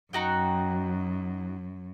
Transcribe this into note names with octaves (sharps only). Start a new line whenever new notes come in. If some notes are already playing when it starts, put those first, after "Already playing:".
F#2 D#4 F#4 G5